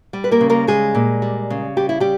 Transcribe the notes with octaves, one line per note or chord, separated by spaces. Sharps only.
G3
B4
A#3 A#4
C#3
A#3 A#4
G3 G#3 G#4
A#2
G3
C#3
G3 G4
E4
G3 G4